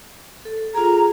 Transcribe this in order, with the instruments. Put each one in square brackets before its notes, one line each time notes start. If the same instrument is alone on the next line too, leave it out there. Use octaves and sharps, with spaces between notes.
[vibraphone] A4
[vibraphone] F4 G#4 [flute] A#5